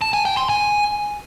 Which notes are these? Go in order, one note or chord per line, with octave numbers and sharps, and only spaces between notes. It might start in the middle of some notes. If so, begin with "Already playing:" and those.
A5
G#5
G5
C6
G#5